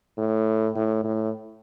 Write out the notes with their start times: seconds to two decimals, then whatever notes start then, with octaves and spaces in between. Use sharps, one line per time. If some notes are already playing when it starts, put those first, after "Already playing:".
0.18 A2
0.75 A2
1.04 A2